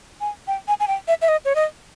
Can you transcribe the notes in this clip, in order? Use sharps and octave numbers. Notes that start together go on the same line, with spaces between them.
G#5
G5
G#5
G#5
G5
E5
E5
D#5
C#5
D#5